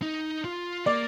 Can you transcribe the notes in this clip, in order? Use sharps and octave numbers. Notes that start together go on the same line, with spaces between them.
D#4
F4
A#3 D5